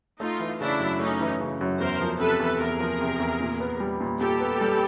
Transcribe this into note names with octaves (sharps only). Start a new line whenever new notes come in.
A3 D#4 F4
E3
C#3 D4 E4
F#2
A3 C#4 D#4
E3
C#3
F#2
E2 A#4 C5
F3
C3 A4 B4
E2
E2 G#4 A#4
F3
C3
E2
A#2
B3
G3
A#2
A#2 G4 A4
B3
G3